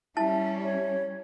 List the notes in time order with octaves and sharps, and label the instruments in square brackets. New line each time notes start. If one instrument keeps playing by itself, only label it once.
[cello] G3 C#4 [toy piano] E4 A5 [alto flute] E5
[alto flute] C#5